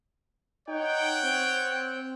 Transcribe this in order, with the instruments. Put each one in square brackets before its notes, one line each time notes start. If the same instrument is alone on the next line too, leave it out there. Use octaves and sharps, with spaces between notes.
[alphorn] D#4 [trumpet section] C#5 F#5 G5
[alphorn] C4